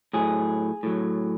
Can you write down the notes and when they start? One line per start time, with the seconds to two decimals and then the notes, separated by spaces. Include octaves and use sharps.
0.13 A2 F#3 G#4
0.83 A2 F#3